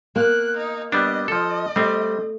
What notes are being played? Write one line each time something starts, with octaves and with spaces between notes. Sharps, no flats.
A#3 F#6
D#4
G3 B3 D4 D#5
F3 A4 D#5
G3 A3 C4